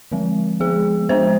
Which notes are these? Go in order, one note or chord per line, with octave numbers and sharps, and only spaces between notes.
D3 F3 G#3 C4
F3 G#3 B3 G#4
F3 G#3 B3 D4 C5